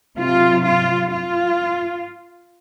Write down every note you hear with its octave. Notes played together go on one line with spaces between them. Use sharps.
C3 F#3 F4
F4
F4